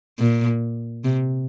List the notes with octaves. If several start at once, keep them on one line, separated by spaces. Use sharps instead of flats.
A#2
C3